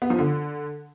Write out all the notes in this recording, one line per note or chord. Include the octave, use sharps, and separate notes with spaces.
B3
F3
D3